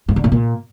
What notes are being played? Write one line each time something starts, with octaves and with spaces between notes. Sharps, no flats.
G2
D3
A2
A#2